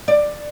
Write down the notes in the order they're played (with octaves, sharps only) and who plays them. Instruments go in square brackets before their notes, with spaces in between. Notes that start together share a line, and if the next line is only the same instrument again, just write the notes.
[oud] D5